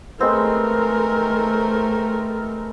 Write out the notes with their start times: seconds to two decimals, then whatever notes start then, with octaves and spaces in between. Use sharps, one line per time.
0.21 G#3 A3 B3 C4 A#4